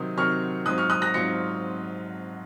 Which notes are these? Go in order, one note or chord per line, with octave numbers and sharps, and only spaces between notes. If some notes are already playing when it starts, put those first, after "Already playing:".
Already playing: C3 D#3 F#3 C4 D#6
C3 D#3 F#3 C4 C#6 F6
G#2 F#3 C4 F4 D#6 F#6
C#6 F6
D#6 F#6
F#6 A#6
G#2 F#3 C4 F4 A#6 C#7